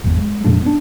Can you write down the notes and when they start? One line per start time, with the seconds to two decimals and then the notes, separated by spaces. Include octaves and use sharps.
0.04 G#1 E2
0.18 G#3
0.44 F2 A#2 G#3 D4
0.62 B3 D4